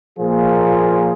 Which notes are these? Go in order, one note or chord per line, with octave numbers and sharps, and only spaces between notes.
A#2 F3 A#3 F4 G#4